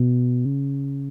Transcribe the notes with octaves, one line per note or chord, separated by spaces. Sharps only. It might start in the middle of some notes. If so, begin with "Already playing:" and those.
Already playing: B2
C#3